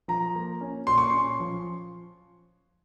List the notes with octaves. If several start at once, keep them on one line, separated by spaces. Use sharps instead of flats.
F3 A#5
A#3
C#4
A#2 C6
C#6
C#4 C6
F3